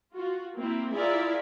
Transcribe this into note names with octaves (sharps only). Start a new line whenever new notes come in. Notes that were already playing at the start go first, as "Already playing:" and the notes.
F4 F#4
A#3 C4 E4
E4 F4 G#4 A#4 D5 E5